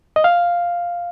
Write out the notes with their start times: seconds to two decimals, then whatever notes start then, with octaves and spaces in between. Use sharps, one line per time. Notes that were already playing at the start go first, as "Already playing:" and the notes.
0.16 D#5
0.24 F5